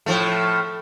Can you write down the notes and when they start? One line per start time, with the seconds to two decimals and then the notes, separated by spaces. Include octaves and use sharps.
0.06 A2 F3 A3